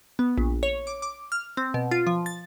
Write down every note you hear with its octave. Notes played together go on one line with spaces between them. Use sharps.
B3
A#1
C#5
D6
D6
F6
C4
B2
F4
F3
A6